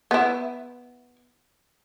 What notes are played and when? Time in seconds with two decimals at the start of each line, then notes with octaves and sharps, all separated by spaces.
0.11 B3 E4